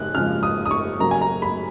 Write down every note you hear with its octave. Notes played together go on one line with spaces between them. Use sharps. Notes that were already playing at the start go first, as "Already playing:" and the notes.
Already playing: C#3 G#3 F#6
C#3 F3 G#3 F6
D#6
D#6
C#6
C#3 F#3 A#3 A#5
G#5
A#5
B5